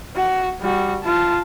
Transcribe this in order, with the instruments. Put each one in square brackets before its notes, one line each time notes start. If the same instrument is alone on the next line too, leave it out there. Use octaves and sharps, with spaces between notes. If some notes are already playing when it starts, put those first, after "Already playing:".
[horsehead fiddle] F#4
G3 F#4
F4 A5